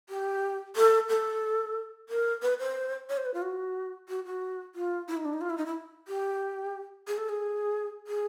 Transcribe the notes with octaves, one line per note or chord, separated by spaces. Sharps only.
G4
A4
A4
A#4
B4
C5
C#5
C5
B4
F4
F#4
F#4
F#4
F4
E4
D#4
D4
D#4
F4
E4
D#4
E4
G4
G#4
A4
G#4
G#4